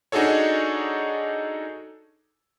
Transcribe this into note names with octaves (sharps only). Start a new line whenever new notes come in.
D4 D#4 F#4 G#4 A4 C#5